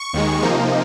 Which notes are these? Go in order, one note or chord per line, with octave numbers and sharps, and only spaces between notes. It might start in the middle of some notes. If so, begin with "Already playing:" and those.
Already playing: C#6
D#2 D#3 G#3
C3 F3 A#3 D#4